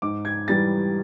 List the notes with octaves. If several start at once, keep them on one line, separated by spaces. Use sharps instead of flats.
G#2 D6
G#6
E3 G3 A6